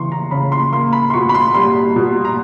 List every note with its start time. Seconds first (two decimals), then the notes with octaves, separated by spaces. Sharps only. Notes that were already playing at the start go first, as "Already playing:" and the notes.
Already playing: C#3 E3 C6 C#6
0.12 A#5
0.31 C#3 B5
0.52 C6
0.73 A#3 C6
0.93 B5
1.10 C6
1.14 B2 C#6
1.29 B5
1.35 C6
1.54 G3 C6
1.96 B2
2.25 A#5